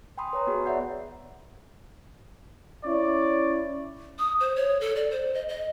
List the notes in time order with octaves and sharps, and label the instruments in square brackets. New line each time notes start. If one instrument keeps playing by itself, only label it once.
[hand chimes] G5 G#5 B5 C6 D#6
B4 C#5 A#5
B3 F#4 G#4 B5
C#5 D5 E5 F#5 G6 C7
[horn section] C#4 E4 C#5 D5
[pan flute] D#6
C5
C#5
A4
D5
C5
D#5
D#5